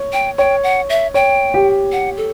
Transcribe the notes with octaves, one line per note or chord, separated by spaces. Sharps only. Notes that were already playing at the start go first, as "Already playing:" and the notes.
Already playing: C#5
G5
C#5 G5
F#5
E5
C#5 G5
G4
F#5
A4